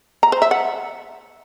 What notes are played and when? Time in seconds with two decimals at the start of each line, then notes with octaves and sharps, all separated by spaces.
0.23 A#5
0.32 C5
0.42 E5
0.51 F#5